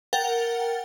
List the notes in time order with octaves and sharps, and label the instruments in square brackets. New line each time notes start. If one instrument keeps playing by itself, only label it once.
[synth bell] A#4 F#5 G5 A6 G7